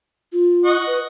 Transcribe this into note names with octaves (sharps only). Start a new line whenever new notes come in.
F4
D#5 F#5 C#6
B4